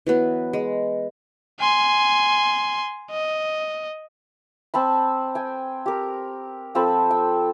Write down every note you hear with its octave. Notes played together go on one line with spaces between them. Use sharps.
E3 F#3 B3
G#3
G#5 C6
D#5
C4 A5 B5
G5 G#5
G4 A#4
F3 C4 A4 B5
G5